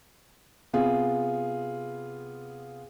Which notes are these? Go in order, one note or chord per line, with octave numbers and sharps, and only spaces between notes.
C3 B3 F4 G#4